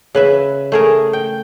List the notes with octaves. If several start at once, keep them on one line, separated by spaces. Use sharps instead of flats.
C#3 B4 E5
A3 G#4 A#4
G5